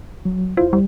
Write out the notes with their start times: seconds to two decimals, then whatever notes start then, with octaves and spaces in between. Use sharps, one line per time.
0.25 F#3
0.57 E2 E4 F4 C5
0.73 G3